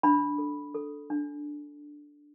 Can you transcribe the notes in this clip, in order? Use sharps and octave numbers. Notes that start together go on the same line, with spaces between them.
D4 B5
A4
A4
D4